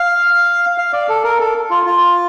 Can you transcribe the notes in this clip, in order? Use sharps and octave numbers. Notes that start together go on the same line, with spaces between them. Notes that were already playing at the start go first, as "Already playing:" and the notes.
Already playing: F5
F5
D5
A4
A#4
A4
F4
F4